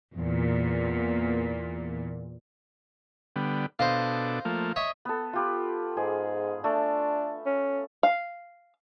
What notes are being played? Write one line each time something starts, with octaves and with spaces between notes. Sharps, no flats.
E2 A#2
D3 G3 B3
B2 D4 A4 C5 D#5 F5
F3 A3 A#3
C#5 D#5 E5
B3 A4
F4 G4 B4
G#2 G#4
A3 D4
C#4
F5